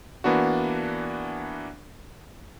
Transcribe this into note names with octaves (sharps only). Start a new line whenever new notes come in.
E3 A#3 B3 D4 F#4